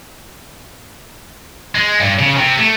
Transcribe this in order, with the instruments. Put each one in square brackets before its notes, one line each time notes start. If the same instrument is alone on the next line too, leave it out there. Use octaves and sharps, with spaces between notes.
[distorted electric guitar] G#3
G2
C#3
C3
A3